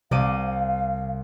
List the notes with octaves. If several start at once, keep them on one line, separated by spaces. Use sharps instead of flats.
C2 C3 F5 D6 D#7